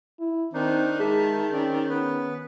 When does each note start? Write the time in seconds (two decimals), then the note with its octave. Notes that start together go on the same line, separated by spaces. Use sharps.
0.19 E4
0.54 D#3 C4 D4 D#4
1.00 G#3 G#4 E5 A5
1.53 C4 C#4 D5
1.89 B3 B4